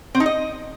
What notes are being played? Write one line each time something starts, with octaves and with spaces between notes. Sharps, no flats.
C4
D#4
D#5